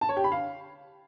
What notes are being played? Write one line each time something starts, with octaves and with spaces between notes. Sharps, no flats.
A5
C#5
G4
B5
F5